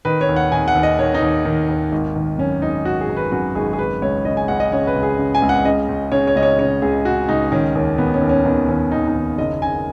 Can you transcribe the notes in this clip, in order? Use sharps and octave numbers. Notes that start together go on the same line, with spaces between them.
D#3 B4
C#5
D#2
F#5
D#3 G#5
F#5
D#2
D#5
D#3 C#5
D#4
D#2
D#3
D#2
G#1
D#3
F#2 C#4
G#1 D#4
G#1 F#4
G#4
D#3
B4
F#2 F#4
G#1 G#4
G#4
C#3 B4
C#2 C#5
C#3 D#5
G#5
C#2 F#5
D#5
C#3 C#5
B4
C#2
G#4
C#3
G#5
C#2
F#5
C#3 D#5
C#2
C#3 C#5
C#5
C#2 D#5
C#5
C#3 C#5
C#2 G#4
C#3 F#4
C#2 D#4
D#3 C#4
D#2 C#4
D#3 B3
C#4
D#2
C#4
D#3 B3
D#2 C#4
D#3 D#4
D#4
D#2
F#1 D#5
C#3 G#5